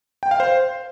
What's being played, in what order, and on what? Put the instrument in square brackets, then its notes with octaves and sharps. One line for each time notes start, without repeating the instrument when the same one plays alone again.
[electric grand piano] G5
F5
C5